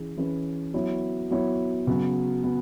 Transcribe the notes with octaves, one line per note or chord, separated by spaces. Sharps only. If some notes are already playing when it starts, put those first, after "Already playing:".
Already playing: E3 C#4 G#4
E3 C#4 G#4 B4
F#3 B3 E4 C#5
F#3 B3 E4 C#5
C#3 F#3 B3
B3